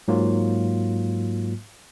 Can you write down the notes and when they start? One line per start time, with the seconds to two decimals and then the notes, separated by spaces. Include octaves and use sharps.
0.08 G#2 F#3 A#3 F4